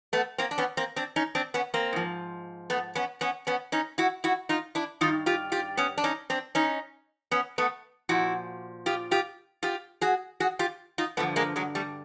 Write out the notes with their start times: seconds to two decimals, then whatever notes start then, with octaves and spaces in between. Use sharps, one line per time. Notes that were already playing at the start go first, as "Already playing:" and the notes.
0.13 A3 B3
0.38 A#3 C4
0.51 D4
0.58 B3 C#4
0.77 A#3 C4
0.96 C4 D4
1.16 C#4 D#4
1.35 C4 D4
1.54 B3 C#4
1.74 A#3 C4
1.93 G#2 F3
2.70 A3 B3
2.95 B3 C#4
3.21 B3 C#4
3.47 B3 C#4
3.72 C#4 D#4
3.98 E4 F#4
4.24 E4 F#4
4.49 D#4 F4
4.75 D4 E4
5.01 G2 D#3 D#4 F4
5.26 F4 G4
5.52 F4 G4
5.77 B3 C#4
5.98 D4
6.04 C#4 D#4
6.30 C4 D4
6.55 C#4 D#4
7.31 B3 C#4
7.58 A3 B3
8.09 A#2 F3 E4 F#4
8.86 F4 G4
9.11 F4 G4
9.63 F4 G4
10.01 F#4 G#4
10.40 F#4 G#4
10.59 F4 G4
10.98 D#4 F4
11.17 G2 D3 F3 A3 B3
11.36 G#3 A#3
11.56 F#3 G#3
11.75 G3 A3